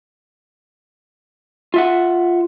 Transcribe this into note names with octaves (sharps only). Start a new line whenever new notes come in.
F4 E5 F#5